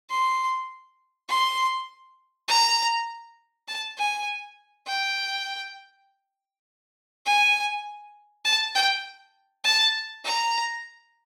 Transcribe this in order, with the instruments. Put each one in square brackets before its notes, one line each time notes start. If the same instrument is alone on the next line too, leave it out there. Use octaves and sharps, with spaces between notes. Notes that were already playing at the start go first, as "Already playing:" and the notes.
[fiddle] C6
C6
A#5
A5
G#5
G5
G#5
A5
G5
A5
A#5